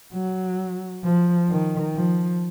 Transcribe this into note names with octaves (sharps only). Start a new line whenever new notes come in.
F#3
F3
D#3
F3